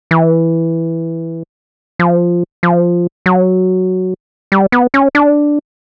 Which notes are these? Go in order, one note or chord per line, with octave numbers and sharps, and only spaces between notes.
E3
F3
F3
F#3
G3
B3
C#4
D4